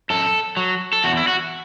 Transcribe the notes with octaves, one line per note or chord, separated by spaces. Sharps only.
F#2 A4
F#3
A4
E2 F#4
E4
F#4